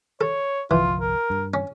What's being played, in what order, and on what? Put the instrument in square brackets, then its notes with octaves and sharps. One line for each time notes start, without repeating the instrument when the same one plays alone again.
[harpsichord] A4 [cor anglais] C#5
[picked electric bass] G1 C2 F3 [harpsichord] E3 [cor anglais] F4
[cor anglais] A#4
[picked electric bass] G2
[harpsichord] C#4